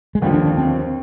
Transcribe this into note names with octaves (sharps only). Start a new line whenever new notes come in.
G#3
D#2 D3 F3 G3
D4
D4
C4